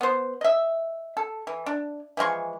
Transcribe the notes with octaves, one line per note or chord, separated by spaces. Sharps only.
B3 C5
D#5 E5
A4
E3
D4
E3 F3 G#3 C#6